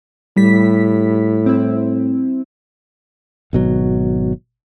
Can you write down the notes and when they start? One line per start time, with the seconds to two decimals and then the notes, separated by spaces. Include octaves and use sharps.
0.37 A2 G3 B6
1.46 C4 E4
3.53 G#1 B2 F#3